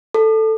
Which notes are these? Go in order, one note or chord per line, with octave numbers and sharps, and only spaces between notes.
A4